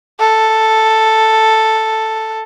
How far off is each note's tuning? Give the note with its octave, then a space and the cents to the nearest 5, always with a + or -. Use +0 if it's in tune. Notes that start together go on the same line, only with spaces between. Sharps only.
A4 +5